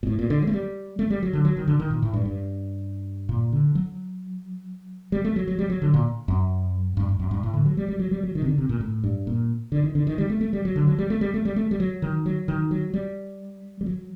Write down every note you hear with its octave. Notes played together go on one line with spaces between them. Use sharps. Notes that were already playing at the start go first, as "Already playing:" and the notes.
A#2
A2
A#2
D3
F#3
A3
G3
A3
G3
F#3
D3
F#3
D#3
D3
D#3
A#2
A2
G2
G2
A#2
D3
F#3
G3
A3
F#3
F#3
G3
F#3
D3
A#2
F#2
G2
G2
F#2
G2
A2
D3
F#3
G3
G3
F#3
G3
F#3
D#3
C3
D3
C3
A#2
A2
G2
A#2
D3
D#3
D3
D#3
G3
A3
A3
G3
F#3
D3
F#3
G3
A3
G3
A3
G3
A3
G3
F#3
D#3
F#3
D#3
F#3
G3
G3
F#3